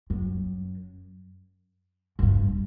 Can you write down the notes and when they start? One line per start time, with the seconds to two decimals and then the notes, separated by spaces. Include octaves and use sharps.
0.10 F#2
2.19 F#2
2.22 G2